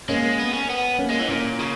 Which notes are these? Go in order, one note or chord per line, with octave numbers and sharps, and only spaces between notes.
G#3 A#3 C#4
B3
C#4
B3
A#3 C#4
G#3
E3
A#2 A#3 C#4
C#3